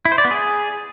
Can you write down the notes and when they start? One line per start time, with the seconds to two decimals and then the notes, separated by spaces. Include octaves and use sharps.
0.05 E4
0.12 C5
0.18 D5
0.25 B3
0.31 G#4